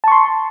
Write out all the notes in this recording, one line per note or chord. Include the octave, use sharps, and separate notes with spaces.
A5 C6 C#6